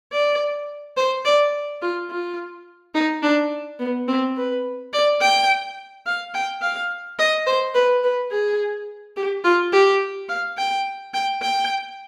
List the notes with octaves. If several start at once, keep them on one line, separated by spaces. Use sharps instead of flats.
D5
C5
D5
F4
F4
D#4
D4
B3
C4
B4
D5
G5
F5
G5
F5
D#5
C5
B4
B4
G#4
G4
F4
G4
F5
G5
G5
G5